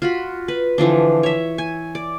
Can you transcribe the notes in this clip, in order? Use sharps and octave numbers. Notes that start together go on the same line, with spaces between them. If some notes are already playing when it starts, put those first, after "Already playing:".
F4 F#4 B5
B4
D3 E3 F3 D4
C#5 E5
G#5
D5